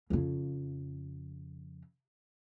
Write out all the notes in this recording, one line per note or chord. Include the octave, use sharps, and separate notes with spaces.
F2 C#3